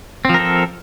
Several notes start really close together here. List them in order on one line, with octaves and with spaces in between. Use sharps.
C4 F3 A#4 A4